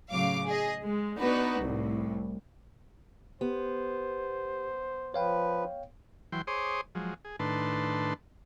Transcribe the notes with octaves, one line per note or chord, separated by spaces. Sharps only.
A2 C#3 F#3 F5 D6
G#4 D#5
G#3
B3 D4 D#4 F#4 B4
C2 A2
B3 G4 C5
F3 B4 C#5 F5 G5
E3 F#3 G5 C6
G#4 C5 C#5 C6 D6 D#6
F3 F#3 G#3
G#4
A2 D#3 D4 B4 A5 C6